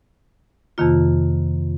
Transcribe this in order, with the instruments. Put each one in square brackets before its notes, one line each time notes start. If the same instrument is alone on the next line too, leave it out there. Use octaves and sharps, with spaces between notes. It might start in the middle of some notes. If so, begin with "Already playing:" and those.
[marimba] F2 C3 D#3 A#3 F4